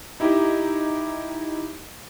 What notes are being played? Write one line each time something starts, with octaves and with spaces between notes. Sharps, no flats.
D#4 E4 G4